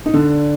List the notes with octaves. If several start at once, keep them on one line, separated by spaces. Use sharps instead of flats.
D#4
D3 D4